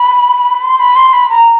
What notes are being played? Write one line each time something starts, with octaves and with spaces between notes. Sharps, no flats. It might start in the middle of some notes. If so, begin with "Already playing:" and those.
Already playing: B5
C6
B5
C6
B5
A#5